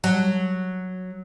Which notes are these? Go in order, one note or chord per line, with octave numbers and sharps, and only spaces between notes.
F#3